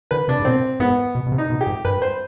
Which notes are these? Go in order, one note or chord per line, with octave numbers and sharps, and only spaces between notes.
D3 B4
C3 D4
G#2
B2 C4
G#2 B3
B2
B2
C3
D#4
B2
G4
G#2
G2 B4
C5